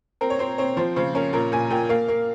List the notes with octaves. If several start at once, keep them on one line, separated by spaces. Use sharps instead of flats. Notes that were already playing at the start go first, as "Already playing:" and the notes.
C4 A#4
C#5
C4 C5
C4 C#5
F3 C5
C#3 C5
C#4 A#4
A#2 A#4
A#2 G#5
A#2 G5
A#3 F5
A#3